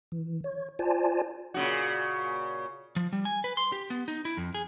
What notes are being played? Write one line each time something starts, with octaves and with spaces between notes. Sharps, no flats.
E3
C#5
F4 C5 D5 G#5 A5
A#2 C#3 F#4
F3
G3
G#5
B4
C6
G4
B3
D#4
E4
F2
G#4